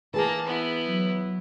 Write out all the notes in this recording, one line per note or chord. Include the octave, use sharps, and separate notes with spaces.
E3 A#3 G#4 A5
B3 E4
F#3